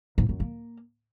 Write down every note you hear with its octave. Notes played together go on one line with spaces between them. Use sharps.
G#2
F#2
A#3